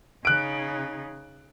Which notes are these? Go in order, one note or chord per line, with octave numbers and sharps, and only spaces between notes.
C#3 D#4 F#6 D7